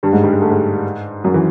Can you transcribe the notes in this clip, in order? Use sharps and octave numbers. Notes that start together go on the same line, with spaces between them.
G2 G3
G#2 G#3
G2 G3
G#3
A3
G#2 G#3
F#2 F#3
E3